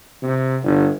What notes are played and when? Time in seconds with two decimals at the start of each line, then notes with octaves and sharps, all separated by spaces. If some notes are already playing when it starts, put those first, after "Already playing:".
0.23 C3
0.63 G1